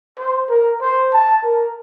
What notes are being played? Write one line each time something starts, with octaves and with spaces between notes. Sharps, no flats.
C5
A#4
C5
A5
A#4